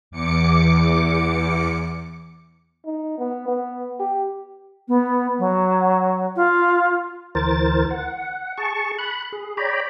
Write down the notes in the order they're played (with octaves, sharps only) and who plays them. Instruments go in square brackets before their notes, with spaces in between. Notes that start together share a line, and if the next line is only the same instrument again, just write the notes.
[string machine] E2 D6 C#7
[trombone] D#4
B3
B3
G4
[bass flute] B3
F#3
F4
[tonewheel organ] D2 E3 A#4 C5 A6
F#5
G#4 A5 C#6
B5 F#6
G#4
C#5 D5 G5 A#5 B5